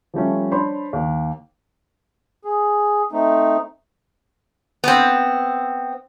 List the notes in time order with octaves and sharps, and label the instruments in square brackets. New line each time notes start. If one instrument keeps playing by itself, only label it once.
[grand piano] F3 G3 A3 C#4
D4 C5 C#5 B5 C6
D#2
[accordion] G#4
A3 C4 D#4
[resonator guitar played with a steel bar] B3 C4